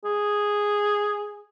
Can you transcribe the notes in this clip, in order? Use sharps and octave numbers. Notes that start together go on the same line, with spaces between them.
G#4